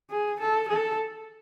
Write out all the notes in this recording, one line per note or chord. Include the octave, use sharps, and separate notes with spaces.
G#4
A4
A4